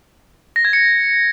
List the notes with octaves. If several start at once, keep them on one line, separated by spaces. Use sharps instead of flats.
A#6
G#6
C#7